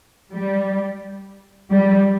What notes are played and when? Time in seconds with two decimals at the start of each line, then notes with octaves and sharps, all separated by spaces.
0.32 G3
1.70 G3